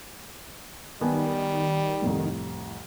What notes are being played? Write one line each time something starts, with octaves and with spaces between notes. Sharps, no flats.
D#3 G3 B3 G#5 A5
C2 F2 A2